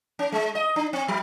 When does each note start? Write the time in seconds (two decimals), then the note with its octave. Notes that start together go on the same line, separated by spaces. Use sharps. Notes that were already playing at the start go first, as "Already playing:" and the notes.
0.19 C#4
0.32 G#3
0.55 D#5
0.76 D4
0.93 C4
1.08 F#3